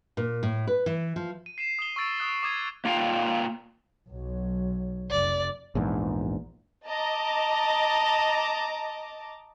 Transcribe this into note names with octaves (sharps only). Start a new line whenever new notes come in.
A#2
A2
B4
E3
F3
D#7
C7 D#7 E7
D#6 E7 G7
C#6 E6 A6 D7
D#6 F#6 E7
D6 D#6 G#6 D#7 E7
A#3 F4 F5 G5
B1 F#3
F1 D5
A#1 E2 G#2
D#5 A5 A#5 D6